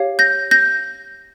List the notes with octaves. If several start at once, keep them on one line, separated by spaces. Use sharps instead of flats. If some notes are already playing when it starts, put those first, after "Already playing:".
Already playing: G4 C#5 F5
G6 A#6
G6 A#6